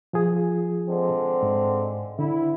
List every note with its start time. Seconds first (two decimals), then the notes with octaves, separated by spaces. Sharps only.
0.13 F3 F4 G#4
0.89 D3 G#3 C4
1.43 G#2
2.19 D3 E4